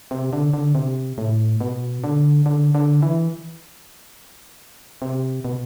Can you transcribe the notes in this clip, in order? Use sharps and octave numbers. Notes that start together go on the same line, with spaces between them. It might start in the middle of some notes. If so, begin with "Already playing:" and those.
C3
D3
D3
C3
A2
B2
D3
D3
D3
E3
C3
B2